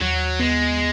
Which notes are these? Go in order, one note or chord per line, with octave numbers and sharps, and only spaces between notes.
D#2 F#3
G#3 B3